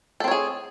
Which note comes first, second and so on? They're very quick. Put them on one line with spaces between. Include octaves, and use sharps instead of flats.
A4 C4 C#5 G#4